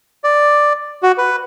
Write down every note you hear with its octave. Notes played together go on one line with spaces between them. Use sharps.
D5
F#4
B4